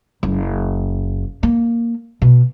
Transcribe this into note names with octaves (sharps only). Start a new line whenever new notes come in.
F#1
A#3
B2